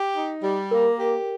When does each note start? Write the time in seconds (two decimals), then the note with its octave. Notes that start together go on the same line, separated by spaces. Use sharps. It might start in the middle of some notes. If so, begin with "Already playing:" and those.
Already playing: G4
0.15 D#4
0.43 G3
0.71 A#3 A#4
0.99 G4